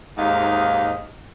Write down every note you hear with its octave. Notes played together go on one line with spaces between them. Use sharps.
D#2 G#2 C3 D#4 F5